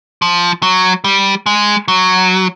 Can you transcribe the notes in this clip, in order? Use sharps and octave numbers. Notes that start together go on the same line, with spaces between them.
F3
F#3
G3
G#3
F#3